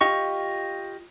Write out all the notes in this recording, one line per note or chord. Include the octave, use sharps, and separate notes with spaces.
F4 G4 D#5 C#6